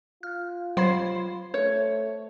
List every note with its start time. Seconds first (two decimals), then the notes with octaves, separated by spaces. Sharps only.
0.23 F4 F6
0.77 F#3 C5 B5 G#6
1.54 A3 C#5